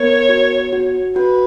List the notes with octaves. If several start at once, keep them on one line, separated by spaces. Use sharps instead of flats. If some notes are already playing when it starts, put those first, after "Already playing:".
Already playing: B3 A#4 C#5
F#4
F#4
F#4 B4